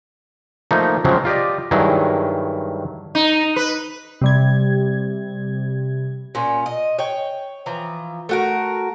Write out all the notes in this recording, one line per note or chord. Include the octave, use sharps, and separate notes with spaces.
F3 A3 A#3 D#4
C#3 F3 F#3 G#3 C4
F4 G4 D5 D#5
G2 D#3 F#3 E4 G#4
D#4
B4
C3 G3 G#6
A#2 C#4
D#5
C#5 G5
E3 F3 A#5
A3 F#4 A#4